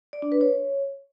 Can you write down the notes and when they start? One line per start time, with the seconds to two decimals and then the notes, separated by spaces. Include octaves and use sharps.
0.13 D5
0.22 D4
0.32 B4
0.41 C#5